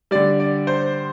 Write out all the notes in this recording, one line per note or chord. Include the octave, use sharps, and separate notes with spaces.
D3 G3 D5
D5
C5